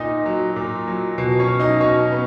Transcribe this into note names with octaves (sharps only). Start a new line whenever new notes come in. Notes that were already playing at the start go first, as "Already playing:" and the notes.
Already playing: A#2 D#4 D#5
F#3
A#2
F#3
B2
C#4 C#5
F#3
D#4 D#5
B2 C#4 C#5
B3